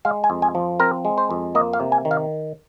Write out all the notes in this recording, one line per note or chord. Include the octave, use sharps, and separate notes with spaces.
G#3 F5
G#5
F2
G#5
F3
C4 A#4
G#3
C5
F2
A#3 D#5
F5
C3
G#5
D#3
F5